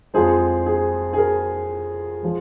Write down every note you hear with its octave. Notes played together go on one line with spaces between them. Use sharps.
F2 F3 G#3 G#4 C5
G#4
G#4
A#4
F3 G#3